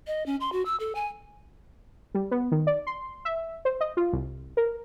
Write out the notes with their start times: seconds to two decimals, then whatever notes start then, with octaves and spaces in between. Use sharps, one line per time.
0.07 D#5
0.26 C#4
0.40 C6
0.52 F#4
0.65 E6
0.80 A4
0.95 G#5
2.15 G3
2.31 B3
2.52 D#3
2.67 D5
2.87 C6
3.25 E5
3.65 C5
3.81 D#5
3.97 F4
4.13 C2
4.57 A#4